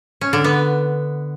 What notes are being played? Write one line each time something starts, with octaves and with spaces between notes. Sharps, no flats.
C#4
D3
B3